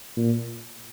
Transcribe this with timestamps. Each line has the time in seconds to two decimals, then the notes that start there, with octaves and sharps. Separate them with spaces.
0.17 A#2